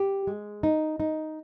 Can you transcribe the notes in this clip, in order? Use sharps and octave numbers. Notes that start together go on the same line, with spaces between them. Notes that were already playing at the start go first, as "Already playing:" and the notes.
Already playing: G4
G#3
D#4
D#4